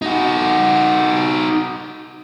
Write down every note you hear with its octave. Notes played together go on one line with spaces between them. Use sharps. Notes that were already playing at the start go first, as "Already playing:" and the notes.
D#4 F#4